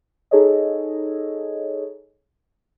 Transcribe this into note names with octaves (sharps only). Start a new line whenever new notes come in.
D#4 G#4 A4 C#5 D#5